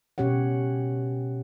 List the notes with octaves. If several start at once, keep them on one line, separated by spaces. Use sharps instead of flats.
B2 C#4 G4 C#5 F#5